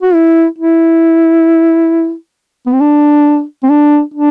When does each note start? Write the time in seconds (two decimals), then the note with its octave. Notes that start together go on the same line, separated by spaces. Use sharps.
0.02 F#4
0.14 E4
0.58 E4
2.66 B3
2.73 C4
2.80 D4
3.63 C4
3.69 D4
4.14 D4